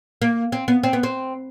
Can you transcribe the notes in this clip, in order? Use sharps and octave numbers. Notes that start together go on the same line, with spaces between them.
A#3
C4
B3
C4
B3
C4